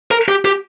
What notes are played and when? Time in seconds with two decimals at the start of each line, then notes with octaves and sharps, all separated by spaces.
0.11 A#4
0.28 G4
0.45 G4